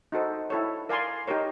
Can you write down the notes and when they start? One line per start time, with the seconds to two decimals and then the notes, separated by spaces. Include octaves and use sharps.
0.12 D#4 F#4 A4 C5
0.50 E4 A4 C#5
0.89 A#4 D5 F5 G#5 C6
1.27 D#4 G4 A#4 C#5